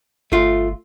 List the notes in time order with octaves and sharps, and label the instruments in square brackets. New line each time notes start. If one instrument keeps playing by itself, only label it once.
[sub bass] G1 [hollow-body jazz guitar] A3 F4